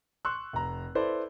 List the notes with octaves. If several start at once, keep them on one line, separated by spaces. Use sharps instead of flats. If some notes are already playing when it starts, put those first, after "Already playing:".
C6 C#6 E6 F#6
F1 A#5
E4 A4 B4 C5 D5